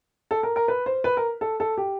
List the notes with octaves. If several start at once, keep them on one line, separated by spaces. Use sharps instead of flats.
A4
A#4
A#4
B4
C5
B4
A#4
A4
A4
G4